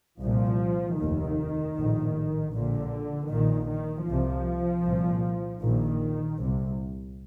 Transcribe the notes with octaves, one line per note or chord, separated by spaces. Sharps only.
C2 A#2 F3
F1 D#2 D#3
A#1 A2
A#1 A#2 D3
A#1 A#2 D#3
D#3
C2 C3 F3
C2 A#2
A#1 A#2 D#3
C2 C3